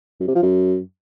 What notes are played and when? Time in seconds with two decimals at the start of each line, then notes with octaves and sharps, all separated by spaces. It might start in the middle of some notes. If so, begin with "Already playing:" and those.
0.20 F#2
0.28 C3
0.35 F3
0.43 F#2